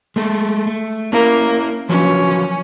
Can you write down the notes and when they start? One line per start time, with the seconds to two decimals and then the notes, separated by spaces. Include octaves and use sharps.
0.16 G#3 A3 A4
0.67 A3
1.13 A#3 C#4 E4
1.89 F3 F#3 C#4 B4